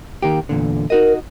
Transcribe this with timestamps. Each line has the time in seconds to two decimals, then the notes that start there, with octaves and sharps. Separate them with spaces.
0.22 D#3 A#3 G4
0.49 E2 A#2 D3
0.90 D#4 F#4 A#4 D#5